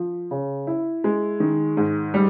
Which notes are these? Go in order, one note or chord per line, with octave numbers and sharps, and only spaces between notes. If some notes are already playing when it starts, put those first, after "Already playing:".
Already playing: F3
C#3
E4
G#3
D#3
G#2
G3